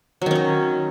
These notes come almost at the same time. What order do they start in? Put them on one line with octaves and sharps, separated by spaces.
F#3 D#3 C#4 D#4